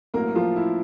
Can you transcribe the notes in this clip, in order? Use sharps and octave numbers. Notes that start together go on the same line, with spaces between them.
A1 A2 F#3 A#3 A#4
F3 F4
E4